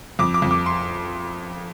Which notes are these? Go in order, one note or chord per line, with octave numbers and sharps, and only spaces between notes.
F2 D6
D6
F2
D6
C6